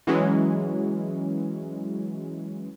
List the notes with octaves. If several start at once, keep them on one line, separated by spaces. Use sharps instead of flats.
E3 F#3 G#3 C#4